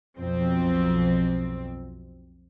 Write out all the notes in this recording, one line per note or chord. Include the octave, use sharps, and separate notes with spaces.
B1 F2 C4